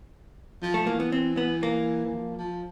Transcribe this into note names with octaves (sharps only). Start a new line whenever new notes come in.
F3
A3
E3 A#3
B3
C4
B3
A#3
E3
F3
F3